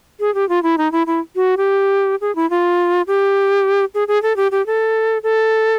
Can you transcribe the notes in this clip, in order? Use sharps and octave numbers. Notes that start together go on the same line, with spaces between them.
G#4
G4
F4
E4
D#4
E4
E4
F#4
G4
G#4
E4
F4
G4
G#4
G#4
A4
G4
G4
A4
A4